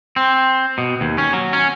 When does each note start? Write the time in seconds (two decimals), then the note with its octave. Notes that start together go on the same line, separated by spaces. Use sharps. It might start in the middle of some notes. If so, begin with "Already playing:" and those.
0.16 C4
0.78 B2
1.01 D#2
1.18 C#4
1.33 F#3
1.53 C#4